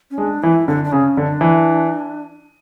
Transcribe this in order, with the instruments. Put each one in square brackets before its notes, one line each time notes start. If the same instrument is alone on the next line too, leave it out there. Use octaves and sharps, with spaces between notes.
[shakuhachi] C#4
[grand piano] G#3 [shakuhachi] D4
[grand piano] E3 [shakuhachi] E4
[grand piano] D3 [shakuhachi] D4
[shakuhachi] D4
[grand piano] C#3 [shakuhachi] C#4
[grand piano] D3 [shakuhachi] D4
[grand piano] E3